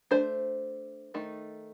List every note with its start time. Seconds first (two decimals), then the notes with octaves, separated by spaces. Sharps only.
0.11 A3 D4 C5
1.14 D#3 A3 D#4